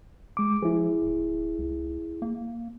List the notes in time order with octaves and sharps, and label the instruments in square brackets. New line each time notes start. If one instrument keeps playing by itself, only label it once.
[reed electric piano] G#3 D6
[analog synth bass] F3 [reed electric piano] E4 G#4
[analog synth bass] D1
C#2
A#3